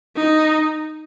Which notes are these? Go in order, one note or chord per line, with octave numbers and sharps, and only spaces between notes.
D#4